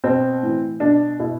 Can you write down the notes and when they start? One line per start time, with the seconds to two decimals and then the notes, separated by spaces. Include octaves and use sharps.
0.04 B2 C4
0.43 A2 E3
0.80 B2 D4
1.19 B2 E4